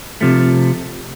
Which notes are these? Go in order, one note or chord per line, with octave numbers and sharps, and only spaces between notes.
C3 F3 A3